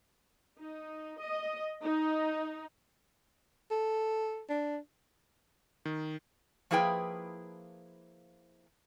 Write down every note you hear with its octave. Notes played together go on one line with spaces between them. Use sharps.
D#4
D#5
D#4
A4
D4
D#3
F3 A#3 E4 G#4 B4 G5